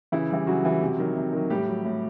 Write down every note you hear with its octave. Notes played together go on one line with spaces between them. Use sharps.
C#3 E3 E4
E3 G3
C#3 F#3 F#4
E3 G3
C3
D#3 F#3
C3
D#3 F#3
A2 G3 G4
F#3
A2